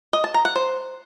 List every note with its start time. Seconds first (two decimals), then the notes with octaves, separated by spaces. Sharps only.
0.13 D#5
0.24 A5
0.34 A#5
0.45 F#5
0.56 C5